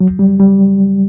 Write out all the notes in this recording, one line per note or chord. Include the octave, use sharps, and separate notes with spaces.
F#3
G3
G3